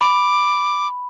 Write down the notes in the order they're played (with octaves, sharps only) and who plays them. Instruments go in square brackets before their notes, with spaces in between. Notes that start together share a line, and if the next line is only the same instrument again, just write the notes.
[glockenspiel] B5 [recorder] D6